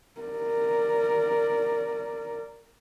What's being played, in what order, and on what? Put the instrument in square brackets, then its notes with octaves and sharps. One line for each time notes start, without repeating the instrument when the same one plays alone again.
[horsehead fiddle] A#4 D5